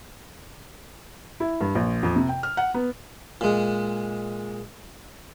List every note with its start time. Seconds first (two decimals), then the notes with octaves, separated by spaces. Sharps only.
1.40 E4
1.61 G2
1.75 A#1
2.03 F2
2.16 C3
2.29 G5
2.43 F6
2.57 F#5
2.74 B3
3.41 A#2 G#3